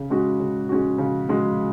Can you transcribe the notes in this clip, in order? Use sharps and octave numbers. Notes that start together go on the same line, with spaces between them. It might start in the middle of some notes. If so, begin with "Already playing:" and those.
Already playing: C#3
G#3 C#4 F#4
C#3
G#3 C#4 F#4
C#3
G#3 C#4 F#4